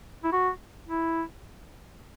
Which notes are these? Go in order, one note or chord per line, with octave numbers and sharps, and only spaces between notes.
E4
F#4
E4